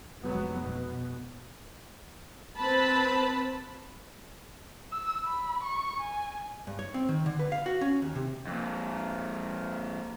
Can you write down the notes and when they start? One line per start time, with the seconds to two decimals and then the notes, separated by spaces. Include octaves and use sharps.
0.22 F1 F#3 G#3 B3
0.64 B2
2.58 C4 B4 A5 B5
4.92 E6
5.25 B5
5.63 C#6
6.00 G#5
6.67 G2
6.79 C#5
6.94 C4
7.09 D#3
7.26 D3
7.39 B4
7.52 F5
7.66 F#4
7.81 C#4
8.02 D#2
8.15 C3
8.47 F2 A#2